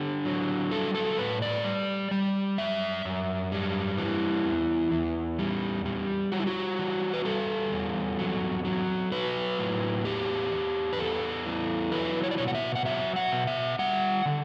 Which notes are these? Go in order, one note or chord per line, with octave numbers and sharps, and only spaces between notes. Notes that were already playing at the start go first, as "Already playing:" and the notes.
Already playing: D3 G4
F#3
G3 A4
A4
A2 B4
D5
G3
G3
F#2 E5
F#2
G3
E3
E2
E2
G3
G3
G3 F#4
E4
F#4
E3
B4
G3 A4
E2
F#3
F#3
F#3 B4
A2
E2 G4
E2
B4
E2 A4
E3
F#3 B4
C#5
D5
B2 C#5
F#5
E5
F#5
F#3 E5
F#5
B2
E5
G3 F#5
D3